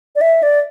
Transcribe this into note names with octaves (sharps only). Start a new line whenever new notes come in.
D5
E5
D5